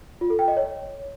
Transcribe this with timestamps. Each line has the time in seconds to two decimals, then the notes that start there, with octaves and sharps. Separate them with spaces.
0.21 F4
0.30 A4
0.39 G5
0.48 D#5
0.57 C#5